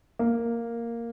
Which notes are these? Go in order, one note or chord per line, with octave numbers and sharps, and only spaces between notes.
A#3